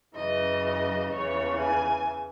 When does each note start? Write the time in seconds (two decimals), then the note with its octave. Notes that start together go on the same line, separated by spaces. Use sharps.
0.15 F#2 C#3 E3 D#5
1.11 E2 C#3 E3 C#5
1.59 G#5